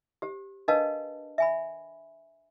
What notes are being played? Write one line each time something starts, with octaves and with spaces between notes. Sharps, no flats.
G4 C5
D4 A#4 B4 D#5 F5 A5
E5 G#5 B5